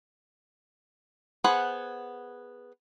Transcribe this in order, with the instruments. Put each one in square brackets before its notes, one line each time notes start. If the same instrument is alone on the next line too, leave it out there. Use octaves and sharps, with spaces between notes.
[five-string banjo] B3 G#4 C5 F#5 B5